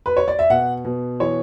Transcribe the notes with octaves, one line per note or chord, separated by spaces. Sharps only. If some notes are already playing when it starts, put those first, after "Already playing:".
B4
C#5
D5
E5
B2 F#5
B2
E3 C#5